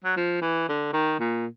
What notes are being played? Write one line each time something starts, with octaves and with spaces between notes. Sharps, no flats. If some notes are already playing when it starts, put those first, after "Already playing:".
F#3
F3
E3
D3
D#3
A#2